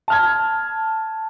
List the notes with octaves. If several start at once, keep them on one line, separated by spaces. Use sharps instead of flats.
A5 F6 G#6